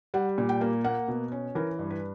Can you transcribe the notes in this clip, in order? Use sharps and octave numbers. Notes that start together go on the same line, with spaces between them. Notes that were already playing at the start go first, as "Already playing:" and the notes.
G3 F#5
A#2
G5
A#3
A#3 F#5
B2
C#4
E3 A#4
G2
B4